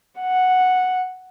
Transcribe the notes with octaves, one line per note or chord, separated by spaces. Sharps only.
F#5